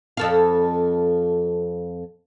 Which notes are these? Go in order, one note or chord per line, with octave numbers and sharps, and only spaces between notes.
F2 A4 F5